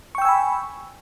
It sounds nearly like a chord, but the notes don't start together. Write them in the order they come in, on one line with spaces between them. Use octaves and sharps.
C#6 G5 E6 G#5 B5